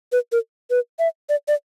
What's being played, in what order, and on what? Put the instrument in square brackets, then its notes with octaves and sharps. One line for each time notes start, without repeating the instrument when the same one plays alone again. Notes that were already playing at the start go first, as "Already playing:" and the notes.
[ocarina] B4
A#4
B4
E5
D5
D5